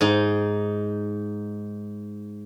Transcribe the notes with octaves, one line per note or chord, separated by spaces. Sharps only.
G#2 D#4